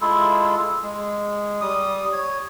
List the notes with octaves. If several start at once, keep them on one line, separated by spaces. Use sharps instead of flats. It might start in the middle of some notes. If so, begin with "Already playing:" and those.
G#3 E4 F4 A4
G#3
G3 D#6
C#5